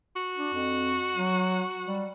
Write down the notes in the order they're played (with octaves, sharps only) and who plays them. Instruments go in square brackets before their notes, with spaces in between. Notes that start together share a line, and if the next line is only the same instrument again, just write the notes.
[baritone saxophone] F#4
[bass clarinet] D4
F2
F#3
G3